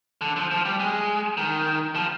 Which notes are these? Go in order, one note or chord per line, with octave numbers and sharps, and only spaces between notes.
D3
F3
F3
G3
G#3
D#3
F3